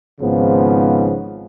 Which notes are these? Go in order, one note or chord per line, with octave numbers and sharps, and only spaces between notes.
G#1 G#2 C#3 F3 B3